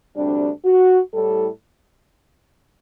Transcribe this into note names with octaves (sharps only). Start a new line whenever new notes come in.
D2 C3 G3 D4
F#4
A2 G3 A4